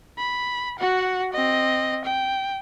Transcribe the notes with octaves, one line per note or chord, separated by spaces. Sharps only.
B5
F#4 F#5
C4 D#5
G5